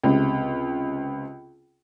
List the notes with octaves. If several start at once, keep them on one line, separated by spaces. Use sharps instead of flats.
C#2 C3